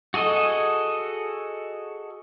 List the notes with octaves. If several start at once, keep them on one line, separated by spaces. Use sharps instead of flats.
F#4 G#4 A4 D#5